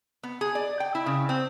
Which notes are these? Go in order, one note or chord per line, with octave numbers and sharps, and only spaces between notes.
B3
G#4
D5
G5
E4
C#3
C4